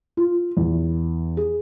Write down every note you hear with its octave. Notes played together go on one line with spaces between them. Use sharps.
F4
E2
G#4